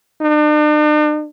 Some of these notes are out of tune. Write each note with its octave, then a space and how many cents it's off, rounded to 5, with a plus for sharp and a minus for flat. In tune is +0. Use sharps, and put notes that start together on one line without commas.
D4 +45